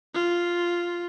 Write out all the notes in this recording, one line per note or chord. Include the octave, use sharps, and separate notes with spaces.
F4